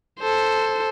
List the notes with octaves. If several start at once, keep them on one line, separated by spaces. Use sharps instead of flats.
A4 C5